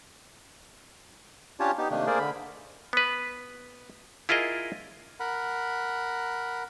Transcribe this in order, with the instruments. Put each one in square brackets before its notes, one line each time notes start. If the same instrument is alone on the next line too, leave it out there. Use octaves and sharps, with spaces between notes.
[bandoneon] C#4 D4 F4 G4 C#5 A5
B3 D#4 G4
C3 D#3 A3 A#3 D4
A3 A#3 G#4 A#4 C5 D5
D3 B5
[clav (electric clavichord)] B3 B4
E4 F4 G#4 A#4 D#5
[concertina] A#4 F#5 B5